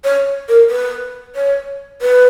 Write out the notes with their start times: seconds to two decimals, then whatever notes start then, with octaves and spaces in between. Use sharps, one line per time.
0.04 C#5
0.49 A#4
0.70 B4
1.35 C#5
2.02 B4